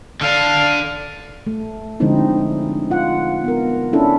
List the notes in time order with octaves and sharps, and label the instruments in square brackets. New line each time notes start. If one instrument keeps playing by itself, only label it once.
[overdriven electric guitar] D3 D4 [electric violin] F5
[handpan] A3
D3 F3 G#3 C4 D#4 E4
F4 F#5
B3 A#4
C#4 D4 E4 A4